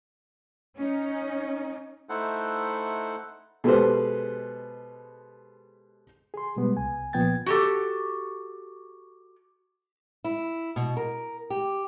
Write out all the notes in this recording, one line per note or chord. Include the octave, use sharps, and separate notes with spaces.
C#4 D#4
A3 D#4 E4 A4 C5 F#5
B2 G#3 G4 A4 B4 C5
G#4 C6
B2 G3 G#3 B3
C2 G#5
A#2 F3 B3 G5 G#6 A6
F#4 G4 A4
E4
B2
A#4
G4